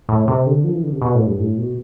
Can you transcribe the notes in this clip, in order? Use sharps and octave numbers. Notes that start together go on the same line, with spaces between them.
A2
C3
D3
F3
E3
D3
C3
B2
A2
G2
A2
B2